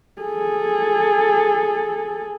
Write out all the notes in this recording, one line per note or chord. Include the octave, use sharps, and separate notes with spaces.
G#4 A4